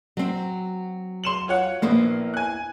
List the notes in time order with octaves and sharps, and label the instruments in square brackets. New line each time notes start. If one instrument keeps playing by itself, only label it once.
[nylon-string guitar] F#3 C4
[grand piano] C6 E7 F#7
F4 C#5 F#5
[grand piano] A#1 B3 [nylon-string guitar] A#3 E4 C5
[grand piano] G#5 F#6